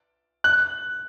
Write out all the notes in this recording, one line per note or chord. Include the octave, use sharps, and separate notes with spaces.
F#6